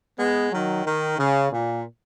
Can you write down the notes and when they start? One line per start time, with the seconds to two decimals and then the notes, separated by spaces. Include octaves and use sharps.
0.18 G#3 B3
0.52 D#3 F#3
0.85 D#3
1.18 C#3
1.53 A#2